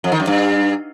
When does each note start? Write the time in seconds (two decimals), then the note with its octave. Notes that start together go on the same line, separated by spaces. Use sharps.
0.04 F2
0.12 D#3
0.20 F#2
0.27 G2